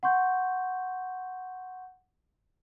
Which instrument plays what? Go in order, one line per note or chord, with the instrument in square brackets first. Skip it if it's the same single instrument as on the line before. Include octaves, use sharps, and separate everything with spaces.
[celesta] F#5 C6 C#6 G6